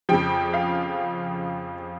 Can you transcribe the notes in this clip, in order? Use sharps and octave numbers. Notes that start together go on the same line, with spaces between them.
F2 C#3 F3 G5
F5